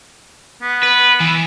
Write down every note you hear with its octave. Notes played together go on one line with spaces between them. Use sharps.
B3
B4
E3